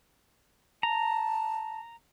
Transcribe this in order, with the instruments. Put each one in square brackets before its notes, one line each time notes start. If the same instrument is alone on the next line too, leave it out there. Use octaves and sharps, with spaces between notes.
[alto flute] A5 [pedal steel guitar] A#5